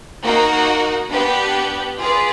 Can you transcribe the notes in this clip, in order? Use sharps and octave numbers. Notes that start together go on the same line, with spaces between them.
A#3 D#4 F#4 A#4
B3 D4 G4 B4
F4 G#4 B4 D5